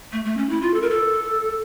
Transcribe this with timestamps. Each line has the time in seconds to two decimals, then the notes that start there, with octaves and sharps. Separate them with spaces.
0.13 A3
0.25 A3
0.37 C#4
0.49 E4
0.61 F4
0.74 A4
0.82 A#4
0.90 A4